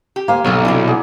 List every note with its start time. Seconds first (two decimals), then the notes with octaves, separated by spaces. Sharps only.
0.16 G4
0.28 D2 A#3 C5 F5 G#5
0.45 B1 D3 F#3 C#5
0.65 C3 D4 E4
0.88 G#4 D5 F#5